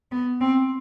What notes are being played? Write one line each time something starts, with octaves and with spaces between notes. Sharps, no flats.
B3
C4